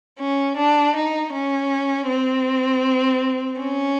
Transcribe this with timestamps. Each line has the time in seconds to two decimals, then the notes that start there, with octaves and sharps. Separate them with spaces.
0.19 C#4
0.57 D4
0.96 D#4
1.33 C#4
2.08 C4
3.60 C#4